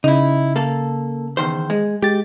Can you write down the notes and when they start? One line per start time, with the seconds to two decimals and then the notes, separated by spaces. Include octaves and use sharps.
0.04 C#3 D#4 E4
0.56 A#3 A4
1.37 E2 D#3 C5
1.70 G#3
2.02 G#3 G4 A6